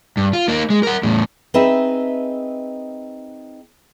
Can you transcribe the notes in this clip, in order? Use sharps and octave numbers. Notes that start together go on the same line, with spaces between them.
G2
F4
A#3 D#4
G#3
A#4 F#5
E2 A2
C4 D#4 G#4 B4 D#5 E5